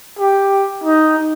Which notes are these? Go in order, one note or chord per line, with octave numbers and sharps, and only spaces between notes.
G4
D#4